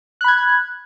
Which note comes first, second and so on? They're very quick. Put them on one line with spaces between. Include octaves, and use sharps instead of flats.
F#6 B5 G#6